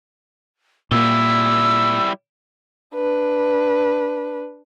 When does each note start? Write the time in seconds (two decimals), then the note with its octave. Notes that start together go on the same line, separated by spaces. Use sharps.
0.91 A#2 G3 A#3 E4 E6
2.94 D4 B4